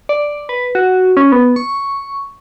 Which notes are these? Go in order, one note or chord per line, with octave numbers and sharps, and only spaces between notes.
D5
B4
F#4
C#4
B3
C#6